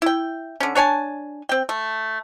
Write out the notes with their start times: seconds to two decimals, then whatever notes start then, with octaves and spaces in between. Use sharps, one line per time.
0.02 E4 G5
0.60 D3 C#4
0.75 D4 C#5 G#5 A5
1.49 C4 G5
1.69 A3